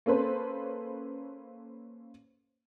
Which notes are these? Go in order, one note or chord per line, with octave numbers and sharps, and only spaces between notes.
A#3 C#4 A4 B4 C5